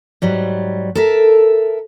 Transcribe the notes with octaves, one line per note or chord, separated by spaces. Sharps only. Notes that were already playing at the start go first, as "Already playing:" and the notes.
G#2 F#3 G3
A4 A#4 E5